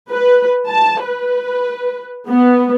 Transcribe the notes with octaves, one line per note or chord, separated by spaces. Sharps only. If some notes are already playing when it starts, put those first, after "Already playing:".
B4
A5
B4
B3